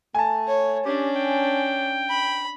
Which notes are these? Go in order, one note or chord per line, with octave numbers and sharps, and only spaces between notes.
A3 G#5 A5
C#5
C#4 D4 G4
G5
B5